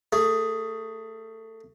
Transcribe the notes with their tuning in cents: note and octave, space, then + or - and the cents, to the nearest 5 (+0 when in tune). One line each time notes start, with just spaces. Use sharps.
A3 +25 G#4 +0